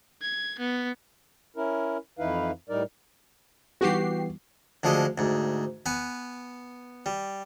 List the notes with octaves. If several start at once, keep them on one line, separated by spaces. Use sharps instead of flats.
G#6
B3
C#4 E4 A#4
F2 E3 D#4 E4 B4 F5
A2 G3 D#4 A#4 D5
E3 G3 B3 F#4 G4 C7
D2 D3 F3 G#3 D#5
D2 G#2
B3 B4 G#5
G3